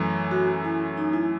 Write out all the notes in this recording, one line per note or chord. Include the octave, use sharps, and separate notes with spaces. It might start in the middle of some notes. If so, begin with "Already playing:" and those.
Already playing: F#2 E3 A3
F#4
E4
D#4
E4